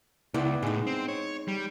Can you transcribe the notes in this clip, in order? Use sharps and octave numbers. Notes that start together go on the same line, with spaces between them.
C#2 B3 E4 D5
A2 G#3 D#4
C4
C#5
G3